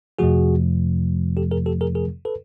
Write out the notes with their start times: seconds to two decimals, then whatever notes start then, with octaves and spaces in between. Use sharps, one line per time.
0.19 F2 C3 F3 A3 F#4 G#4
1.37 G4 A4
1.51 G#4 A#4
1.66 G4 A4
1.81 G#4 A#4
1.95 G#4 A#4
2.25 A4 B4